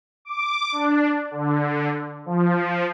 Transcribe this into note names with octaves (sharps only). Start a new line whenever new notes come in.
D6
D4
D3
F3